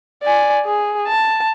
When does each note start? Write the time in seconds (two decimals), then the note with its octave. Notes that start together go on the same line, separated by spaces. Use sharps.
0.23 D5 G#5
0.65 G#4
1.08 A5